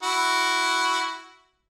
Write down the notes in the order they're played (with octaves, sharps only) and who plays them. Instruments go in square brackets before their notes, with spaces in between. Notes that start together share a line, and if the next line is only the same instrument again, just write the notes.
[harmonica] E4 F#4